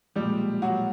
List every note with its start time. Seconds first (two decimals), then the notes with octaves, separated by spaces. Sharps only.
0.15 B1 A#2 F3 G3 G#3 G4
0.62 F#3 F#4